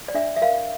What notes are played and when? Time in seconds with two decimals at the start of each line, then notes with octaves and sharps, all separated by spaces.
0.08 D5
0.14 D4 E5
0.36 E5
0.42 A#4 F5